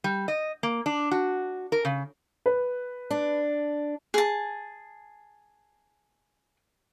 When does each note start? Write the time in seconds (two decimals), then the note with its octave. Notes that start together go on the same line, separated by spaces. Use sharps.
0.04 G3
0.28 D#5
0.63 A#3
0.86 D4
1.11 F#4
1.72 A#4
1.85 C#3
2.46 B4
3.11 D4
4.14 G#4 A5